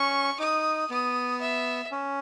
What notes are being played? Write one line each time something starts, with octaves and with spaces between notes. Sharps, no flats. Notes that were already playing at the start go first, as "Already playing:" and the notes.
Already playing: C#4 C#6
D#4 D#6
B3 D#6
E5
C#4